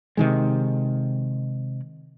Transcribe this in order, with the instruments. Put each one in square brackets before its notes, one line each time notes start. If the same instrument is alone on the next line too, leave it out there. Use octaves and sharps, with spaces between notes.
[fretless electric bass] C3 D#3 G#3